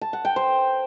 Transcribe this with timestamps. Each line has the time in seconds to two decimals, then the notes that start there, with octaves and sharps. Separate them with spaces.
0.02 A5
0.13 F#5
0.25 G5
0.36 C5